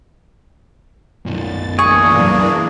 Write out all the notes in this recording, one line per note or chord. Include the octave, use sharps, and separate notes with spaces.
B1 F#2 A6
E3 A#3 D4 G#4 C#6